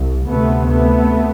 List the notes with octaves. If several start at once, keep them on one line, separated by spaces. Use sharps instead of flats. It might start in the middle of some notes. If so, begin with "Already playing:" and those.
Already playing: C2
D2 C3 A3 B3
A3 B3